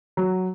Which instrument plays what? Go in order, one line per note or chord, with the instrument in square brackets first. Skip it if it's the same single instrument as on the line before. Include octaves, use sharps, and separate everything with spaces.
[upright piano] F#3